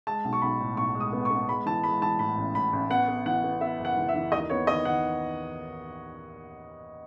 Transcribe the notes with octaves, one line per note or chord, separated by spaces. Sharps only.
G#3 A5
B1
C#6
B1 B5
A2
B1 C#6
G#3
D#6
B3
C#6
B3
G#3 B5
E3 A5
G#3 B5
E3 A5
A2 B5
A1
A2 B5
A1
B3 F#5
B3
E3 F#5
B3
B3 E5
F#1
F#5
E3
E5
E3
D#2 D#5
B3 C#5
D#3 D#5
D#3 F#5